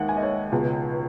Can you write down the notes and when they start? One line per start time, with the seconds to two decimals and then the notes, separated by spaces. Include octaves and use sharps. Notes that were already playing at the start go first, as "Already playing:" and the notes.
Already playing: D#2 D#3 G#3 E5 F#5
0.09 G#5
0.17 D#5
0.23 C#5
0.51 C#2 B2 G#3